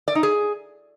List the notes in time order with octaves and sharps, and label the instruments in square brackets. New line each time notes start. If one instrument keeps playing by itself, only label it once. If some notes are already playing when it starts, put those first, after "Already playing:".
[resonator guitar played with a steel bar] D5
D#4
G#4